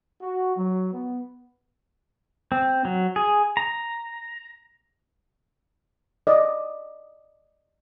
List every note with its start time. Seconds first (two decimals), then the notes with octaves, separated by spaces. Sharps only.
0.22 F#4
0.56 F#3
0.92 B3
2.52 C4
2.85 F#3
3.16 G#4
3.57 A#5
6.27 D5 D#5